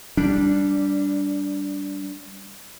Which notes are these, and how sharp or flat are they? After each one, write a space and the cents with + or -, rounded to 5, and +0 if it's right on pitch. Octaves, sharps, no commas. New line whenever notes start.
G3 +0 D4 -15